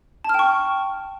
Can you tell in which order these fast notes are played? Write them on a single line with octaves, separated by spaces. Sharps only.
A5 F6 G5 C#6